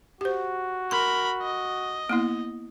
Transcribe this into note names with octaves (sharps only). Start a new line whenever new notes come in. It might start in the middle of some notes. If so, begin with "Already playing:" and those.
F#4 G4 C5
A#4 B5 C6
D#5
A#3 B3 E4